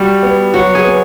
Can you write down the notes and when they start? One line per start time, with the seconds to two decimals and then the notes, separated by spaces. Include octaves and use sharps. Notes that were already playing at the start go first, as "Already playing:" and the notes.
Already playing: G3 F#4
0.23 B3
0.54 F#3 F#4
0.75 G#4
0.85 B3